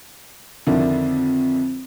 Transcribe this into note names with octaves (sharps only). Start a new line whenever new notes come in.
F2 D3 D#3 D4 E4